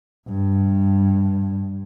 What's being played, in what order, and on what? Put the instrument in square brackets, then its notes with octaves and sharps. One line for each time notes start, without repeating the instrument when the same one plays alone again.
[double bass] G2